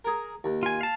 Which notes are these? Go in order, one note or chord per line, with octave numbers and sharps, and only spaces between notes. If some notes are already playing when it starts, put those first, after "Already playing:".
G#4 A#4
D#2
F4 G#5
F5 A5